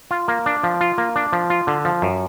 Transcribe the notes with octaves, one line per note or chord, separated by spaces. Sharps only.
F4
A#3
D4
F3
F4
A#3
D4
F3
F4
D3
F3
F#2